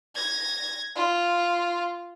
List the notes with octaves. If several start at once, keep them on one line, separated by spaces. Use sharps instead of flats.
G#6 A#6
F4